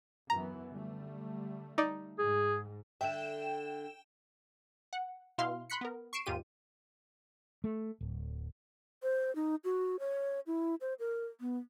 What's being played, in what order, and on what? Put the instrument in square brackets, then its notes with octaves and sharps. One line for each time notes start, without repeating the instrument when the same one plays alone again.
[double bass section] F#2 E3 B3 [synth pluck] A#5
[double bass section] D3 G3 A3
[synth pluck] D#4 D5
[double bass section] G#2 [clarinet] G#4
[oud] D3 E5 [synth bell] G5 E7
[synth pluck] F#5
B2 E4 F5 C6 F6
B5 C6 F#6 B6 C#7
B3 A#4
C#6 C7 D7 E7
D#2 G#2 F4 G4 D#7
[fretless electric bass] A3
D1
[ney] C5
D#4
F#4
C#5
E4
C5
A#4
B3